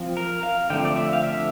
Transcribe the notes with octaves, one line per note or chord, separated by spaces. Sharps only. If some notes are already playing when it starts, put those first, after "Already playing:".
Already playing: F3 C4
A#4
F5
D3 F3 A3 C4 G5
D5
E5
F5
E5